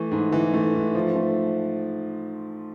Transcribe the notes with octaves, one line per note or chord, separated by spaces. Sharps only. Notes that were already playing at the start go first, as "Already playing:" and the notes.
Already playing: E3 A3
G#2
E3
A3
G#2
F3
A3